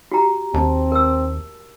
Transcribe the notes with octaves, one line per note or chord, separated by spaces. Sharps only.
F#4 G4 A#5
D#2 C4 A5
A#4 E6